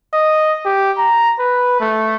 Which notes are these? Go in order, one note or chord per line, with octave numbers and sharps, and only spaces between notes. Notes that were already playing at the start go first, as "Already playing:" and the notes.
D#5
G4
A#5
B4
A3